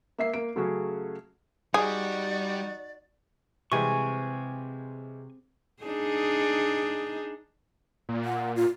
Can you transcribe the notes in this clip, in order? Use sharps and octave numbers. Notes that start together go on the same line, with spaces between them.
A#3 E5 C7
A#3 D7
C#3 F#3 A3 C#4 F#4 G#4
G3 D#4 F#4 G#4 D5
C3 E3 G3 G#3 G#5 C#6
D4 D#4 G#4
A#2
F#5
F4